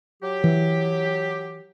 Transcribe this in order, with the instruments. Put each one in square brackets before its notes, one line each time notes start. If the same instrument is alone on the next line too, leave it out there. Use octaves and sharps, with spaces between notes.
[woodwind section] F#3 G4
[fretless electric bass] E3